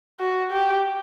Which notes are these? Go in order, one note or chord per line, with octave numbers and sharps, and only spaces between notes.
F#4
G4